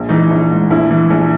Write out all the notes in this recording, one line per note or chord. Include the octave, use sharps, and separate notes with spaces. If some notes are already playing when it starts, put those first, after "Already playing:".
Already playing: A#1
E3 D#4
A#1
G#2
A#1 E4
E3
A#1